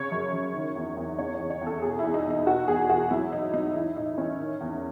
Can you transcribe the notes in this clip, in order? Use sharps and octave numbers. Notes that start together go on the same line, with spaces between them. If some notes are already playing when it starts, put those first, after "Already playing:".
Already playing: C#3 C#5
F#2
F#2
D#3
E2
E2
C#3 C#5
C#5
E2
C#5
E2
A4
B2 G#4
E2 E4
D#4
E2
D#4
B2 F#4
E2 G#4
E2 F#4
F#3 E4
G#2 D#4
F#3 D#4
E3 E4
A2 D#4
E3 C#4
D#3
E2